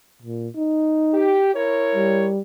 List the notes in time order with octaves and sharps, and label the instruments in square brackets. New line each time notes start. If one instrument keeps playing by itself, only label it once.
[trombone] A#2
D#4
[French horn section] G4
E4 A#4 C#5
[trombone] G3